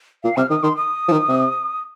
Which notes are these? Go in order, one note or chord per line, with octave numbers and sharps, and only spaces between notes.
A#2 F5
C3 F6
D#3 D#6
D#3 C6
D#6
F3
D#3
C3